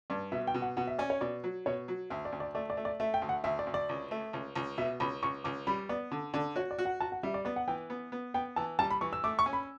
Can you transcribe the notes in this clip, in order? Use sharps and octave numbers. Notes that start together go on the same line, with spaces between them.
G2 D5
B2 E5
G5
B2
F#5
B2 F#5
E5
C#4 D5
C#5
B2 D5
F#3
B2 C#5
F#3
D2 E5
D5
D2
D5
A3 D5
D5
A3
D5
A3 E5
G5
D2
F#5
D2 E5
D5
D2
D5
C#2
A3
C#2
C#2
B2 E5
C#2 B5
C#2 C#6
C#2 D6
G3 B5
B3 D5
D3
D3 D5
F#4 C#5
D5
F#4
F#5
F#4 A5
F#5
G3 E5
D5
B3 D5
F#5
E3 G5
B3
B3
B3 G5
E3 A5
G3 A5
B5
E3 C#6
E6
A3 D6
C#6
C#4
B5